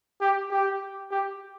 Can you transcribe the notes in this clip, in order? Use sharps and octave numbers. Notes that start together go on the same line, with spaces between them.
G4
G4
G4